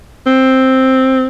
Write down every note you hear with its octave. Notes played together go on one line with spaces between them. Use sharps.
C4